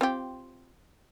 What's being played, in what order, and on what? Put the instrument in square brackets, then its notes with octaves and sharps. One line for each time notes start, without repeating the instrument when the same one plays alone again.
[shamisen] C4 F4 G4